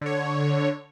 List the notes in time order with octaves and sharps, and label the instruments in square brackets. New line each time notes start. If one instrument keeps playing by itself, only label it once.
[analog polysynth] D3 C#5